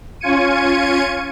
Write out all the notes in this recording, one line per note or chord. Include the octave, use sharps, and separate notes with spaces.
C#4 F4 G#6 C#7 D#7